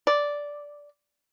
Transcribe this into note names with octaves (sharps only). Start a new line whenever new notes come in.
D5